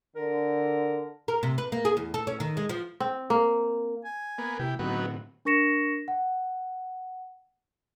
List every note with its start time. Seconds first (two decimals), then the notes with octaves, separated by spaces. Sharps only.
0.16 D3 A#4
1.28 A#4
1.43 C3
1.58 B4
1.72 A#3
1.85 G#4
1.97 E2
2.14 A4
2.27 C#4
2.40 D#3
2.57 G#3
2.69 F3
3.00 C4
3.30 A#3
4.05 G#5
4.38 A#3 B3
4.59 C3 E4 G4
4.79 A2 D3 F#3 B3 C4 D#4
5.45 D4 A#4 C#6 A#6 C#7 E7
6.08 F#5